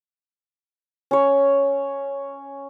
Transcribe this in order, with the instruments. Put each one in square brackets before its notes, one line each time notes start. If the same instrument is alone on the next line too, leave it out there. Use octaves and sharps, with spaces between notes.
[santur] C#4 C#5